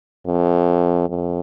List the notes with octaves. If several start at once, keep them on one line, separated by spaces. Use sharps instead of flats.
F2
F2